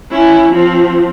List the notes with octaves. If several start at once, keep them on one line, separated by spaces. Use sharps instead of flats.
C#4 E4
F3 C4